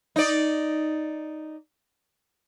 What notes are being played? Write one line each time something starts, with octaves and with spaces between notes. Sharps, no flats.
D#4 D5